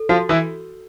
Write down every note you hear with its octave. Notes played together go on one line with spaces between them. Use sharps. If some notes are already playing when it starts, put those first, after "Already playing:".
Already playing: A4
F3 F4 F#4
E3 E4